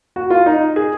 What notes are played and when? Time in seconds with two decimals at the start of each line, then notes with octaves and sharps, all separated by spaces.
0.16 F#4
0.30 F4
0.46 D#4
0.76 G#4